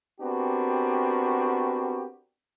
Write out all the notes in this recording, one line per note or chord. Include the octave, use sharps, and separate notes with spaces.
B3 C4 D4 F#4 G4 A#4